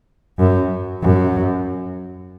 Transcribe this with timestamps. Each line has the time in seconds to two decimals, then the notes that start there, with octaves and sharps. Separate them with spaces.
0.39 F#2
1.02 F#2